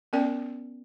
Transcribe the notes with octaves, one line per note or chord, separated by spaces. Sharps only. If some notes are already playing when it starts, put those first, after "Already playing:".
B3 C#4 A#4 D5 G5